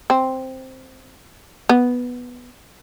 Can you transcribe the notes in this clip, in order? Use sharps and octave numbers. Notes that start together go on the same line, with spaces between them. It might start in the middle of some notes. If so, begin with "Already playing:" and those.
C4
B3